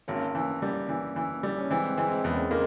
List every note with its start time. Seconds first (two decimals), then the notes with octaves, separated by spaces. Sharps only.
0.08 G#1 A#3 C#4
0.35 E3
0.62 G3
0.89 E3
1.16 E3
1.43 G3
1.58 C#4
1.70 E3 G#3 C4
1.97 E3 G#3 C4
2.24 E2 A#3 C#4
2.51 G#3 A#3